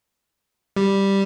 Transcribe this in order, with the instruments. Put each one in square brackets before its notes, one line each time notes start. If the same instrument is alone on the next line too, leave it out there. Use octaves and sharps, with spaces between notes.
[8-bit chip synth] G3